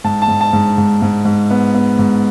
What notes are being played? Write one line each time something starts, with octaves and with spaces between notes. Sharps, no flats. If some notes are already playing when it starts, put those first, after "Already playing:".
G#2 A5
A5
G#2
A5
G#2
G#2
G#2
G#2
B3
B3
G#2